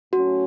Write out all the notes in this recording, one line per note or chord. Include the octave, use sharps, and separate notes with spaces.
A2 F#3 A3 C#4 F#4